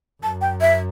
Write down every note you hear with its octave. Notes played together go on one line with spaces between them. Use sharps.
F#2 A5
G5
E5